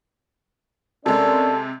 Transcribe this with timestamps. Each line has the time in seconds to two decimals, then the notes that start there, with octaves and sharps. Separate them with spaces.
1.06 C3 G#3 C#4 A4 A#4 D5